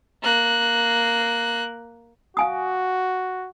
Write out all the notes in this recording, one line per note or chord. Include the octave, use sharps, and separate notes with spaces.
A#3 F#6
F#4 F5 G#5 D#6